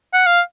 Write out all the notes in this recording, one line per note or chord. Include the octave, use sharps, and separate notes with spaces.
F#5
F5